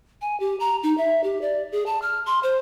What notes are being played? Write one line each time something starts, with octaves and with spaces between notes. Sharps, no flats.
G#5
G4
A#5
D#4
E5
G4
D5
G#4
A5
F6
C6
C5